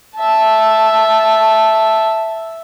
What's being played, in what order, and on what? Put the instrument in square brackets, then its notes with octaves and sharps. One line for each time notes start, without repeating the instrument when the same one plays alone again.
[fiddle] E5 A5